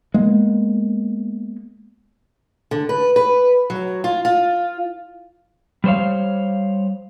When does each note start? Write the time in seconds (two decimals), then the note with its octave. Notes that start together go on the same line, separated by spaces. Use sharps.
0.14 G#3 A#3 B3
2.71 D3
2.89 B4
3.16 B4
3.70 F#3
4.04 F4
4.25 F4
5.84 G3 A3 C5 C#5 F5